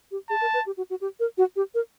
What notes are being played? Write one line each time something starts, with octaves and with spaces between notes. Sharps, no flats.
G4
G#4 A5
A#4
B4
G4
F#4
F#4
G4
A#4
F#4
G4
A#4